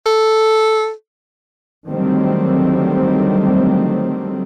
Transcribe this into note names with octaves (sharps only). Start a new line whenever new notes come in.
A4
D3 D#3 F#3 G3 A3 C4